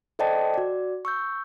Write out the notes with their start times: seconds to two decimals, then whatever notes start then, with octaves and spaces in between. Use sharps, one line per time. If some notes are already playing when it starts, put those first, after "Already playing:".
0.19 A4 C5 D5 D#5 G5 A5
0.54 F#4 D5
1.05 C#6 E6 G6